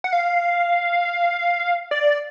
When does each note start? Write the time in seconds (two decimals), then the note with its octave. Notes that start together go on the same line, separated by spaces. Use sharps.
0.04 F#5
0.13 F5
1.91 D5